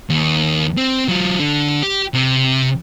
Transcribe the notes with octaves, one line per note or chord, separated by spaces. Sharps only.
D#2
C4
F#3 F4
D3
G4
C3